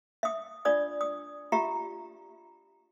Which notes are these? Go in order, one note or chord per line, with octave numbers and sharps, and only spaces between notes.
E5 D#6
D4 F4 D5 D#6
D#6
F4 G4 E5 A#5